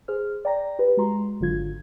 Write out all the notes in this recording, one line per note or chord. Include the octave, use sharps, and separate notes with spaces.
G#4 C5 F6
D5 G5 A#5 A#6
G4 B4
G#3 F#4 A#5 C6
G#1 D3 F#3 F4 G#6